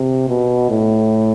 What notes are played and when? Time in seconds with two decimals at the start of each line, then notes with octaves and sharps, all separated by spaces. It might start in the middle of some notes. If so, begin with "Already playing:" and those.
Already playing: C3
0.29 B2
0.70 A2